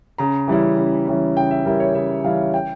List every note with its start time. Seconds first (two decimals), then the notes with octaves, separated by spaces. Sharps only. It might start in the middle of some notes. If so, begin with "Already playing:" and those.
0.18 C#3 A#5
0.48 E3 G3 C#4 E4
0.77 C#3
1.06 E3 G3 C#4 E4
1.37 C#3 G5
1.51 E5
1.66 E3 G3 C#4 E4 A#4
1.80 C#5
1.95 C#3 E5
2.24 E3 G3 C#4 E4 F5
2.54 G5